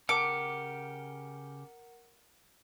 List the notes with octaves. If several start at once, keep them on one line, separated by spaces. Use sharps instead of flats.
C#3 G4 A#4 F#5 D6 C#7